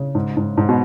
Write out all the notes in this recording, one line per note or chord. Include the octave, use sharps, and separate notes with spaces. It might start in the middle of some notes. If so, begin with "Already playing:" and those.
Already playing: C#3
G#2
G#2
G#2
B2